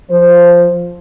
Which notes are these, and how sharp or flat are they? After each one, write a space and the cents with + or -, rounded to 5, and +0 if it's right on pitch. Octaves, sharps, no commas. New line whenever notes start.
F3 +0 C5 +0